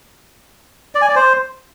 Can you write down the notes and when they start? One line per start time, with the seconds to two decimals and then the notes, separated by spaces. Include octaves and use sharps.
0.95 D5
1.02 G#5
1.09 D5
1.16 C5